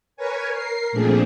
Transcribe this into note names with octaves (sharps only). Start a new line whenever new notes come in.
A#4 B4 C#5 G#5
A#4 C7
A#2 F3 A3 C4 D4 G#4